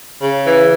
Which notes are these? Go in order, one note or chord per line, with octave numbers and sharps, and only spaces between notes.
C#3
E3